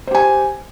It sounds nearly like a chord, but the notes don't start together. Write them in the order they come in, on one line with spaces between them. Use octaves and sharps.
C5 G4 G#5